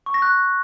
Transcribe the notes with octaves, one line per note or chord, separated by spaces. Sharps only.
C#6
A#6
F#6